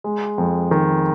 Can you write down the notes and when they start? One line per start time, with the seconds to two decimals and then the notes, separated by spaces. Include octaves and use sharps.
0.04 G#3
0.38 F2
0.71 D#3